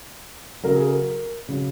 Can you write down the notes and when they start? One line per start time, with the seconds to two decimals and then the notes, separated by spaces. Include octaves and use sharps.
0.63 C#3 F#3 A#4
0.76 G#4
0.88 A#4
1.49 C#3 F#3